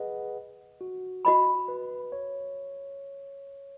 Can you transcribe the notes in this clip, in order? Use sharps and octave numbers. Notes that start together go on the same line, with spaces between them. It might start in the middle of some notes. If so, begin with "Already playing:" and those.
Already playing: G#4 B4 D#5 F#5
F#4
F#4 D#5 B5
B4
C#5